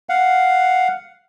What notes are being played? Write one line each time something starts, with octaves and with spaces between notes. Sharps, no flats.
F5 F#5